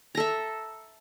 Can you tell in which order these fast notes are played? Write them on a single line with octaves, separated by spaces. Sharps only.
A#5 A4 E5